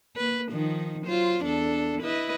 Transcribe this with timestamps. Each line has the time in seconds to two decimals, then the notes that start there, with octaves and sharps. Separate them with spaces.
0.17 A#3 B4
0.51 D#3 F3 D#4
1.03 F#3 F4 C5
1.43 E2 D4 A4
2.01 E4 B4 D#5